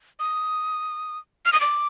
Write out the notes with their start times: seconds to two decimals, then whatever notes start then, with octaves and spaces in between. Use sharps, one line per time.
0.20 D#6
1.46 F6
1.53 D#6
1.60 D6